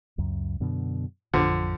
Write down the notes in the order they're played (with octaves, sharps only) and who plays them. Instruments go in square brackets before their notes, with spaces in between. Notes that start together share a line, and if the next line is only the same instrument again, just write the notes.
[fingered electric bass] C#2 F#2
F#2 B2 D3
[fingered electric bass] A1 F2 [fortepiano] D3 F3